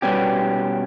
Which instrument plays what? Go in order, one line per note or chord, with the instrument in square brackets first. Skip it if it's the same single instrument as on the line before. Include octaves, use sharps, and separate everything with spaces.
[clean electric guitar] B2 G3 B3 C#4 G4